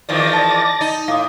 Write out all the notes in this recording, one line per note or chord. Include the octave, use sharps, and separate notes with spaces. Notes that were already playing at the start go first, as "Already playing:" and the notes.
E2 D#3 F3 D5 A6 A#6
A5
D#4
A2 F5 D#6